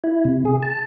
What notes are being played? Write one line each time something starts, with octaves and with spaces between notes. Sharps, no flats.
E4
C3
G#4
A5